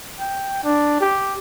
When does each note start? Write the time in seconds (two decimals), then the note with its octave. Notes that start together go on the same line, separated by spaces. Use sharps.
0.20 G5
0.64 D4
1.01 G4